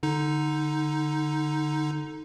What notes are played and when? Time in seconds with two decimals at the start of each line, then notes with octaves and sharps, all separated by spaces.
0.03 D3 D#4